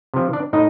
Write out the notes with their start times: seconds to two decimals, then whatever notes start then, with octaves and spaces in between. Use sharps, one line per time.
0.14 C3 F3
0.33 D4 D5
0.53 A2 D#4 D#5